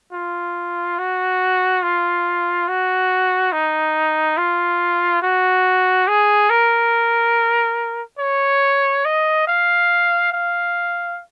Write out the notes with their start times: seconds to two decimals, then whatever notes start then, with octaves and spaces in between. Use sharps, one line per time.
0.13 F4
0.99 F#4
1.83 F4
2.68 F#4
3.53 D#4
4.37 F4
5.22 F#4
6.08 G#4
6.50 A#4
8.19 C#5
9.05 D#5
9.47 F5
10.32 F5